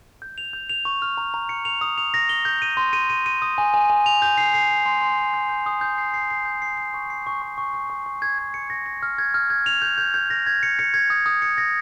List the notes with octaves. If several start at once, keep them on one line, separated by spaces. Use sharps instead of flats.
G6
F7
G6
F7
C#6
F6
A#5
A#5
C#7
F7
D#6
F7
A#6
G7
G6
D#7
C6
D#7
D#7
D#7
D#6
G#5
G#5
G#5
F7
G6
C7
C7
C7
C6
C6
C6
G6
G6
D#6
G6
C7
C7
C7
G6
C7
C7
C#6
C7
C#6
C#6
C#6
C#6
C#6
C#6
G#6
G#6
C#7
A#6
A#6
F6
G#6
F6
G#6
F7
G6
G6
G6
A#6
G#6
C#7
C#7
G#6
D#6
D#6
C#7
A#6